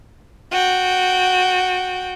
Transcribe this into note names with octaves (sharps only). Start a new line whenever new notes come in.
F#4 G5